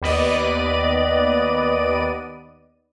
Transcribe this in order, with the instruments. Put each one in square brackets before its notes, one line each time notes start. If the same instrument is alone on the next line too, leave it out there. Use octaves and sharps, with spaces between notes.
[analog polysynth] D#2 B3 B4 D5 D#5 D#7